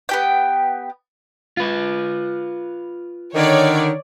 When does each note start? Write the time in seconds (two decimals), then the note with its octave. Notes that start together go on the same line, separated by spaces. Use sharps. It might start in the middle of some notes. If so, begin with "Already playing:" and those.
0.09 B3 G4 G5
1.57 F4 B4
3.35 D3 D#3 C#5 D5